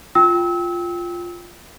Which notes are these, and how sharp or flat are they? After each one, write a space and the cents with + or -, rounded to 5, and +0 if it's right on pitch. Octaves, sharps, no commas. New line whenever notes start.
F4 +0 G5 +0 E6 -35